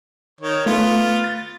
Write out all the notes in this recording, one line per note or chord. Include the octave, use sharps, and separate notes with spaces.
D#3 C#5
A3 B3 F4
A6